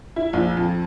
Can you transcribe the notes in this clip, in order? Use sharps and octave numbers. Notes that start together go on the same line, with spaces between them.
E4
A#1
F2